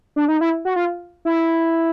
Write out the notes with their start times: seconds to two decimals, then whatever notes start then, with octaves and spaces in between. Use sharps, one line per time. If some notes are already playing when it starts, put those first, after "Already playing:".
0.16 D4
0.28 D#4
0.41 E4
0.65 F#4
0.76 F4
1.25 E4